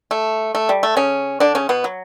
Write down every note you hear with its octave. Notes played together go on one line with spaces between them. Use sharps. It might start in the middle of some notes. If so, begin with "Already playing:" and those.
A3
A3
G3
A3
C#3 C#4
D3 D4
C#3 C#4
B2 B3
F#3